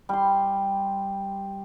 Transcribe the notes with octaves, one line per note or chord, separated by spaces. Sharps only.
G3 C6